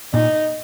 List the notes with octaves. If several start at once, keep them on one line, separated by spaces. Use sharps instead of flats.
A#2 D#4